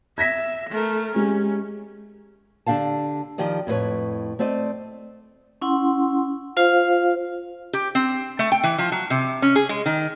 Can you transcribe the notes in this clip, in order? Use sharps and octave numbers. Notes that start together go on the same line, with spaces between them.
E5 G#6 A#6 B6
A3 A#4
G#3 C#4 G4
D3 D4 G4 F5 A5
D#3 F3 G4 D5 D#5
F2 A2 C#4 B4 C#5
A3 C4 C5 D5 D#5
C#4 E4 F#5 C6
F4 C5 F5
G4
C4
A3
G5
E3
F3
F#3
C3
C#4
G#4
G#3
D#3